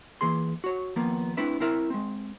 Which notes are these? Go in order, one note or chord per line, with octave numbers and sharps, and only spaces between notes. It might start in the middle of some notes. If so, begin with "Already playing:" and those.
E3 A#3 G#4 C6
F#4 C#5
D#2 F3 A#3 B3
A3 C4 D4 E4 B4 E5
C4 E4 A#4 E5
G#3 C4